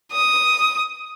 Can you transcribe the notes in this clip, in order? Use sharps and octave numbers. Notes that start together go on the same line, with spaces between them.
D#6